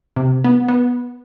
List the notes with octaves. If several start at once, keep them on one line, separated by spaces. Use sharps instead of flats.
C3
B3
B3